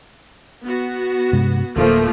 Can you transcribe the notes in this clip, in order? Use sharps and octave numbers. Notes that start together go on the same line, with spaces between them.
B3 F#4
G2 C3 G#3
D1 G#1 D2 F3 A3 A#3